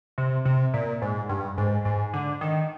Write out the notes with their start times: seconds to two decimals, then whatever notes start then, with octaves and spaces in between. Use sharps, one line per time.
0.18 C3
0.45 C3
0.74 A#2
1.02 G#2
1.29 G2
1.58 G#2
1.85 G#2
2.13 D3
2.41 D#3